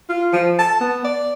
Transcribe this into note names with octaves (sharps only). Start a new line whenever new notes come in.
F4
F3
A5
B3
D5